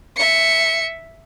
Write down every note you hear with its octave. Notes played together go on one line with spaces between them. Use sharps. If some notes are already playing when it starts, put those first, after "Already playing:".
E5 C#7